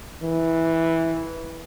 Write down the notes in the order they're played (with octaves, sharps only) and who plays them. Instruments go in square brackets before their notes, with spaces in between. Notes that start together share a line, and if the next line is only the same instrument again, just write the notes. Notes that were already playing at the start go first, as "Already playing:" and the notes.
[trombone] E3